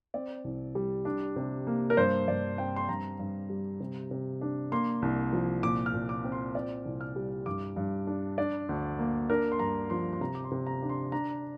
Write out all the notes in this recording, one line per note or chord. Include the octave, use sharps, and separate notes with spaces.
C4 D5
C2
G3
D4
C3
A#3
A#4
G2 C5
G2 D5
C4 G5
C6
G2 A#5
G2
G3
C3
C3
D4
A#3 C6
C2
F3
A#2 D6
F6
A#2
D6
C4
C6
C4 D5
C2
F6
G3
G2 D6
G2
D4
D4 D5
D2
A#3
D4 A#4
C6
G2 A#5
F3 C6
C6
C3 A#5
D6
C6
C3
A#5
D4
C6
D4 A#5